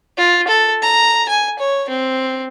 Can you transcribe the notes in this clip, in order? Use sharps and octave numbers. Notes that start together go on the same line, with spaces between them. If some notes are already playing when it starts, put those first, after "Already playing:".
F4
A4
A#5
G#5
C#5
C4